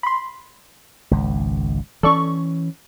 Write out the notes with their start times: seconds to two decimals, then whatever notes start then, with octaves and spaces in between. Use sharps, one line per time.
0.03 B5 C6
1.11 G#1 C#2
2.03 E3 C#4 A4 D5 C#6